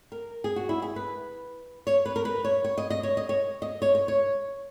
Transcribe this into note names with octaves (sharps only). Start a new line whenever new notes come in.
A#4
G#4
F#4
E4
G#4
B4
C#5
B4
A#4
B4
C#5
C#5
D#5
D#5
C#5
D#5
C#5
D#5
C#5
C#5
C#5